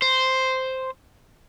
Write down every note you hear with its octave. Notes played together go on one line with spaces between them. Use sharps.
C5